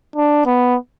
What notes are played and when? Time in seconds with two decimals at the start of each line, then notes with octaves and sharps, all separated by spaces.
0.16 D4
0.46 B3